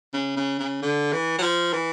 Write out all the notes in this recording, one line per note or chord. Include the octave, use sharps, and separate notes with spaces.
C#3
C#3
C#3
D3
E3
F#3
F3
E3